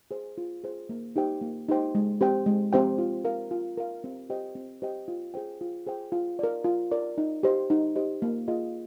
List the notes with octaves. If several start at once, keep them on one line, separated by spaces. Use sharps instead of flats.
G#4 C5
F4
G#4 C5
A#3
D#4 G4 C5 G5
A#3
D#4 G4 C5 G5
G#3
C4 G4 C5 G5
G#3
C4 G4 C5 G5
F4
A#4 F5
F4
A#4 F5
C4
G4 C5 D#5 G5
C4
G4 C5 D#5 G5
F4
G#4 C5 G5
F4
G#4 C5 G5
F4
A#4 D5
F4
A#4 D5
D#4
G4 C5 D#5
D#4
G4 C5 D#5
A#3
F4 G#4 D#5